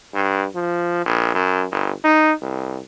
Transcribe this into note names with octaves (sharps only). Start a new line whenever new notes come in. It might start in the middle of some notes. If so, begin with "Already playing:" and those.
G2
F3
A#1
F#2
G1
D#4
C2